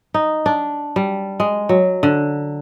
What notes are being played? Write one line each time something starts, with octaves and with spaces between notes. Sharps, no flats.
D#4
D4
G3
G#3
F#3
D3